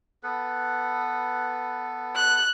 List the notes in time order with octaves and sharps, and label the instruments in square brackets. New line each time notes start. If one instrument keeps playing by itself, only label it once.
[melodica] B3 A4 B4
[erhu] F#6